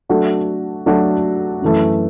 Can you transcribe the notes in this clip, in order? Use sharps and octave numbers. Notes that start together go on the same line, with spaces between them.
F#3 A3 D4 F#4 A4
F#3 A3 D4 F#4 A4
F#2 E3 A3